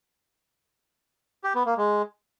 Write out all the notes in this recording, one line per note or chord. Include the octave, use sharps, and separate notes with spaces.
G4
B3
A#3
G#3